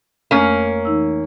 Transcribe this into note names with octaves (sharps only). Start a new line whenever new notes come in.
F2 A3 A#3 C#4
E3 D#4 E6